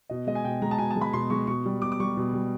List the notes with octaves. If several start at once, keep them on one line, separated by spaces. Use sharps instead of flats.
B2 D#5
G#3 D#5
G#5
B2 G5
G#3 A#5
A5
B2 G#5
A5
G#3
B5
B2 C6
G#3 C#6
B2 C#6
G3
B2 D6
D6
G3 C#6
B2
G3